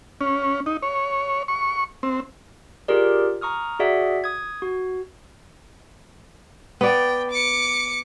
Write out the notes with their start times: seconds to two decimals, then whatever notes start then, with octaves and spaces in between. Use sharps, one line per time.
0.21 C#4
0.66 D#4
0.82 C#5
1.48 C#6
2.03 C4
2.88 F4 G4 G#4 A#4 D5
3.41 A#5 C#6 D#6 F6
3.79 F#4 G#4 D5 E5 F#5
4.24 D#6 G#6
4.62 F#4
6.81 B3 D5 G5
7.31 D6 C#7